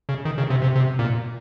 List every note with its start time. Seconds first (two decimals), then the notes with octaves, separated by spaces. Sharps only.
0.09 C#3
0.25 D#3
0.38 C#3
0.50 C3
0.63 C3
0.75 C3
0.99 A#2